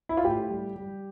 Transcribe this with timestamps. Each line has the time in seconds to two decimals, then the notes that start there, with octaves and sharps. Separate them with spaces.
0.09 E4
0.17 F4
0.25 A2 G4
0.50 G3
0.76 G3